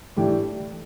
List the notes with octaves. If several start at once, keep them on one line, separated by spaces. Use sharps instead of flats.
A2 E3 A3 D4 G4